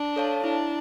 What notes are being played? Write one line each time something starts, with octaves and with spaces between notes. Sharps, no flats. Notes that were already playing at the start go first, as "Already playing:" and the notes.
Already playing: D4
A4 C#5 F5 A5
D4 E4